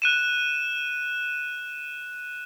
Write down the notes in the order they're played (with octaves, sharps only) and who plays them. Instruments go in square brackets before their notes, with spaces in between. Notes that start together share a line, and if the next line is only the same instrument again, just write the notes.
[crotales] F#6 D#7 E7